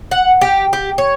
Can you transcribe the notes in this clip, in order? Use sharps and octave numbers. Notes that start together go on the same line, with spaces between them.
F#5
G4
G4
C#5